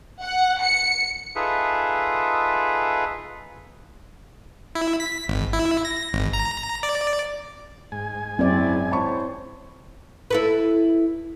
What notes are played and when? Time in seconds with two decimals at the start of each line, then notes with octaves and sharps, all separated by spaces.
0.23 F#5
0.63 C#7
1.36 D#4 F4 G#4 A4 B4 E5
4.75 E4
5.00 B6
5.28 G#1
5.53 E4
5.85 A#6
6.13 G#1
6.33 A#5
6.83 D5
7.92 G#2 G#5
8.39 F#2 C#3 F#3 C4 E4 D5
8.91 E4 C5 C#5 A5 B5 C#6
10.30 E4 A4 B4